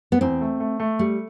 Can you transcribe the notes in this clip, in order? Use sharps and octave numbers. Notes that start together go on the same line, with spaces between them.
B3
E2 C4
A3
A3
A3
G3 A3